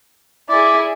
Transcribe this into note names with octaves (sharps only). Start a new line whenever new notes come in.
E4 G#4 D5